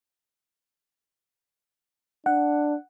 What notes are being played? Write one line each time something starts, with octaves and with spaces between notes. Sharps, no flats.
D4 F#5